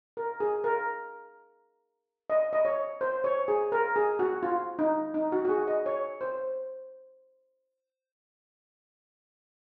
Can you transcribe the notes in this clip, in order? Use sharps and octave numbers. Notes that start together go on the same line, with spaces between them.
A#4
G#4
A#4
D#5
D#5
C#5
C5
C#5
G#4
A#4
G#4
F#4
F4
D#4
D#4
F#4
F#4
G#4
D#5
C#5
C5